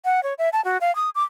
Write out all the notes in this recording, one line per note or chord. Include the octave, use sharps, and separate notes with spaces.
F#5
C#5
E5
A5
F#4
F5
D#6
D6